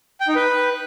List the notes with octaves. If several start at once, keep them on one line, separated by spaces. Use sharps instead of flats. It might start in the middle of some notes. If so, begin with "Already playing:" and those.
G5
D#4
B4